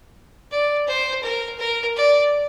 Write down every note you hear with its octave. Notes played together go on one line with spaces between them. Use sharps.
D5
C5
A#4
A#4
D5